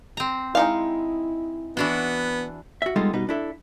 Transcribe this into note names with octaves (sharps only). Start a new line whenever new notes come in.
C4 A#5
G#3 D#4 E4 F5
E3 B3 D4 F#4
F#4 E5
G3 G#3 B3 D#4 F4 A4
B2 G3 D#4 B4
D4 E4 A4